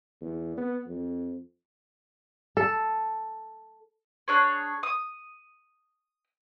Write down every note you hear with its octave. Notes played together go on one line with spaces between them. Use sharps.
E2
B3
F2
A4
D4 G#4 C#5
D#6